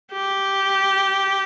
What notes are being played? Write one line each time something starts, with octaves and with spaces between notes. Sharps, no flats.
G4